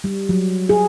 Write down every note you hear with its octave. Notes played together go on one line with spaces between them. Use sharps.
G3
F#3
G#4